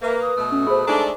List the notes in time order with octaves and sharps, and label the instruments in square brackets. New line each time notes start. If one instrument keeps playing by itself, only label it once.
[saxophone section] A#3 [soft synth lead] B4 [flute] E5
[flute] D#6
[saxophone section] B2 A3
[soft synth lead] C#4
[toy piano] G#4 C5 [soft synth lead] B5
[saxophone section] G#3 A3 D4 [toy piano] D#4 A#5 [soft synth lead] A4